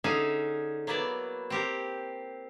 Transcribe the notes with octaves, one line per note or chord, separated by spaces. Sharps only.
D3 C#4 D#4 G#4 E5 F5
F#3 A#3 B3 E4 D5
C4 G4 A#4